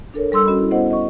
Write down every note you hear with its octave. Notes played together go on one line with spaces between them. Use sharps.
D4 A4 A#4 C#5
G3 A4 C6 E6
C#4 F#4 D#5 B5
E4
B3 E4 C5 D#5 F#5
D#5 C#6